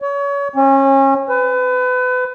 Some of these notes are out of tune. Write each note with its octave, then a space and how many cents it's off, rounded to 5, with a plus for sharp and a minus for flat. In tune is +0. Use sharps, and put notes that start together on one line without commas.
C#5 +30
C#4 -30
B4 +30